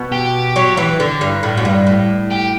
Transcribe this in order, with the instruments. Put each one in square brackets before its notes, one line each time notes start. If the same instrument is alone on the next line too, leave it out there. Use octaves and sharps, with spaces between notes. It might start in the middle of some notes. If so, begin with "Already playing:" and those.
Already playing: [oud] B2
[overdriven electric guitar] G4
[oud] F#3
E3
D3
G2
A2
F#2
G2
A2
[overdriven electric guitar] G4